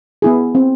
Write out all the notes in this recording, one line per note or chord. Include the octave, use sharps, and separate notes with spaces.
B3 E4 G#4
C4